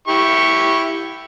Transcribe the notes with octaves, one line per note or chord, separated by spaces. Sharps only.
E4 G4 C#6